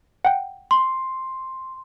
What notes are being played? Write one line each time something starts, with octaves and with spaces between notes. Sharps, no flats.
F#5 G5
C6